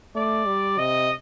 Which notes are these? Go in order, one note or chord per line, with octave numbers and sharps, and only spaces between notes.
A3 D5
G3
C3 D#5